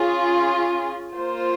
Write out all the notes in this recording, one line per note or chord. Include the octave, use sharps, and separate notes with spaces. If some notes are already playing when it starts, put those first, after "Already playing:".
Already playing: C#4 F4 G#4
A#3 F4 C5